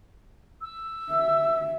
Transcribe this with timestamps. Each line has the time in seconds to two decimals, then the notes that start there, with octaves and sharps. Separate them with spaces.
0.61 E6
1.11 E5